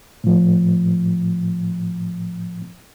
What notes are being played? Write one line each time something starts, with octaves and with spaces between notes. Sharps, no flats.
A2 F3